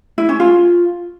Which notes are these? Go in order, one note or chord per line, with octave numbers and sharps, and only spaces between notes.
E4
C#4
F4